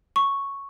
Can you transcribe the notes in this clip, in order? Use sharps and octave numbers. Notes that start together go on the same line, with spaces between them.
C#6